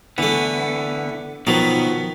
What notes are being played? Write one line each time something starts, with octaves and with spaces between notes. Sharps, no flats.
D3 E3 A3 B3
B2 D#3 F3 F#3 B3